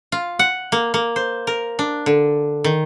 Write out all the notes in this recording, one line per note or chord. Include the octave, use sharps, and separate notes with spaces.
F4
F#5
A#3
A#3
C5
A#4
D4
D3
D#3